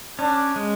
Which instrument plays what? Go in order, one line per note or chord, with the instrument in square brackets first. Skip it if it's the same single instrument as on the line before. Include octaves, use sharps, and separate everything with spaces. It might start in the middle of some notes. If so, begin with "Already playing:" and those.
[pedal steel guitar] C#4 [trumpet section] D4
[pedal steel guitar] G#3